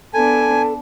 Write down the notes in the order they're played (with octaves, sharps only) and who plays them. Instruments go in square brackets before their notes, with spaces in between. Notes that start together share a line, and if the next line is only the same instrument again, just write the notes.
[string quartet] B3 D4 [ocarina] A4 [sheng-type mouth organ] G#5 [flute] A5